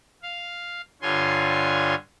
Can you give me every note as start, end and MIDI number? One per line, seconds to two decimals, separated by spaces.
0.23 0.81 77
1.02 1.95 43
1.02 1.95 50
1.02 1.95 65
1.02 1.95 73
1.02 1.95 80
1.02 1.95 84